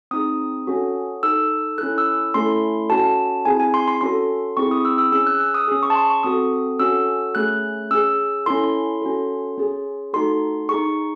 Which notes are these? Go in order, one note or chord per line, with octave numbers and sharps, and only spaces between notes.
C4 D#4 G#4 D#6
C#4 F#4 A4
D#4 A4 E6
C#4 E4 A4 F#6
E6
A3 C#4 E4 A4 C6
C#4 F#4 A4 A5
C4 E4 G#4 G#5
G#5
C6
C6
C#4 F#4 A4 C6
C4 E4 G#4 C#6
D#6
E6
E6
C#4 G#4 E6
F#6
E6
D#6
C#4 G#4 D#6
C#6
A5
C6
C#6
C4 F#4 A4 D#6
C#4 F#4 A4 E6
A3 C#4 G#4 F#6
C#4 G#4 E6
C#4 E4 A4 C6
C#4 F#4 A4
C#4 G#4
A3 D#4 F#4 A4 C6
G#4 C#6
D#4